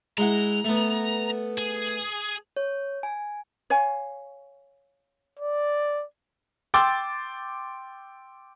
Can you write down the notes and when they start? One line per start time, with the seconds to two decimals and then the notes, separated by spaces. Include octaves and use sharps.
0.18 G#3 E4 F#5 A#5
0.64 A3 B3
1.58 G#4
2.57 C#5
3.03 G#5
3.70 C#5 F5 G#5
5.39 D5
6.74 G5 C6 D6 E6 A6